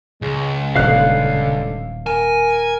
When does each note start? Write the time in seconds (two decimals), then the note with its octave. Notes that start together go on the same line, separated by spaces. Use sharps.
0.22 C#2 G#3
0.76 D#1 B2 D3 F5 F#6
2.06 A#4 G#5